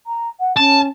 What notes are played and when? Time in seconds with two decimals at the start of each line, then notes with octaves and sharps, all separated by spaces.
0.07 A#5
0.40 F#5
0.57 C#4 A5